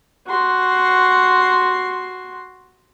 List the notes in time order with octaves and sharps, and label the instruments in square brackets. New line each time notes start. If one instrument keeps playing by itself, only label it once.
[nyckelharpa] F#4 C6